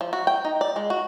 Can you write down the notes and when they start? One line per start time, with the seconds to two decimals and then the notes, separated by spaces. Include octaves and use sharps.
0.01 F3
0.13 F#4
0.27 G5
0.45 D#4
0.61 D5
0.76 G#3
0.90 F#4